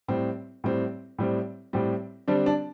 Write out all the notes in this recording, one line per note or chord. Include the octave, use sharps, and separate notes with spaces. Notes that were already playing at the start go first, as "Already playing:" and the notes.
A2 G3 C4
A2 G3 C4
A2 G3 C4
A2 G3 C4
D3 G3 C4 D4
D4